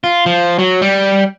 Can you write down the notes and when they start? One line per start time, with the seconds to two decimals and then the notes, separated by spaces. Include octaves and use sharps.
0.04 F4
0.26 F3
0.59 F#3
0.82 G3